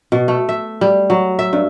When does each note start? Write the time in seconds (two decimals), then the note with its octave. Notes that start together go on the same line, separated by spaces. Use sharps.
0.12 B2
0.28 A3
0.49 E5
0.81 G3
1.10 F#3
1.39 E5
1.53 G2